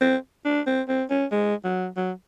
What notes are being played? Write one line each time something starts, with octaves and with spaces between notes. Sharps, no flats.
C4
D4
C4
C4
C#4
G#3
F#3
F#3